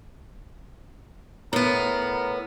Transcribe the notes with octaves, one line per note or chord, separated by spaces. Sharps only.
A2 B3 A#4